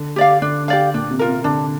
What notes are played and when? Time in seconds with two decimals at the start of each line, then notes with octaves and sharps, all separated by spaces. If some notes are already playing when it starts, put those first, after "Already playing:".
Already playing: D3
0.16 G4 D5 F5
0.42 D3 D4
0.68 G4 D5 F5
0.94 A#2 D4
1.11 C3
1.19 F4 A#4
1.28 C3
1.44 D3 D4